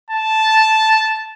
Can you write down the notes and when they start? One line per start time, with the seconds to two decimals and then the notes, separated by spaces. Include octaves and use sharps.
0.11 A5